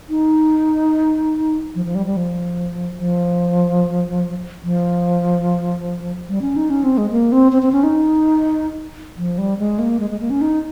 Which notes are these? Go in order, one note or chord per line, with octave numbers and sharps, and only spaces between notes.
D#4
F3
F3
G3
G3
F3
F3
F3
G3
C#4
D#4
C#4
C4
G#3
A#3
C4
C4
C4
C#4
D#4
F3
G3
G#3
A#3
G#3
G#3
A#3
C#4
D#4